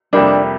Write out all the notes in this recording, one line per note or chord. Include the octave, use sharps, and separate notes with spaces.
F2 C3 G3 A#3 D4